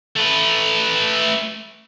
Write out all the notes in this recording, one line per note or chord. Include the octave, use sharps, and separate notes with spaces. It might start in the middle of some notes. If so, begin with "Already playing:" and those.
A3 B4